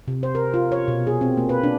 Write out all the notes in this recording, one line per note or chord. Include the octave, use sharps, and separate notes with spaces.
C3
C5
A#4
F4
C#5
B2
G#4
C4
A#3
B4
D4